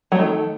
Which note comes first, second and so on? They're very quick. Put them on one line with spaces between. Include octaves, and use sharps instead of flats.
F#3 A3 D#3